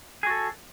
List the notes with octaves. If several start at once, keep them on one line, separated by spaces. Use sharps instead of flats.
F#4 G#4 A4